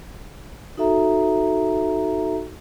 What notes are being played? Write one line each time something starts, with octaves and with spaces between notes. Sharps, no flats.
D#4 F#4 A4 E5 A#5